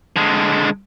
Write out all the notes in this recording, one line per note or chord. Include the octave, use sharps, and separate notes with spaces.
D3 G#3